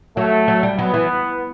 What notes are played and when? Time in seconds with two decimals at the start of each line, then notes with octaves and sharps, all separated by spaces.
0.17 F#3 A3
0.48 F#3
0.63 G3
0.79 F#3 B3
0.94 E3